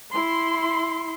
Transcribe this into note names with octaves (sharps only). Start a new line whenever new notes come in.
E4 C6